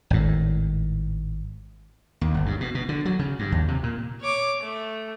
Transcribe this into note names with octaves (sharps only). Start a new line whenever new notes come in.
G#1 A2
D#2
G1
G2
B2
B2
D3
F#3
C#3
G2
D#2
C3
A#2
C#5 D6
A3